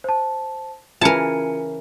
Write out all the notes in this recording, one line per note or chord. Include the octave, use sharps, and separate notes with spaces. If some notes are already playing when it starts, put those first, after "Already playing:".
C5 A5
C#3 E3 C#4 F4 A#4 A5 C#7 D#7